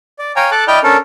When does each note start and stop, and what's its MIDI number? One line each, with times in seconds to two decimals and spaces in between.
0.19 0.32 74
0.36 0.50 73
0.36 0.50 77
0.36 0.50 79
0.36 0.50 80
0.36 0.50 82
0.51 0.64 69
0.51 0.64 81
0.51 0.64 86
0.51 0.64 90
0.68 0.79 64
0.68 0.79 74
0.68 0.79 75
0.68 0.79 79
0.68 0.79 89
0.68 0.79 91
0.83 0.97 61
0.83 0.97 62
0.83 0.97 69
0.83 0.97 70